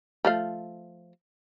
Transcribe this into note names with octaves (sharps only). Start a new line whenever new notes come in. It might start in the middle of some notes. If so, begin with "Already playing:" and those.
F3 A3 F5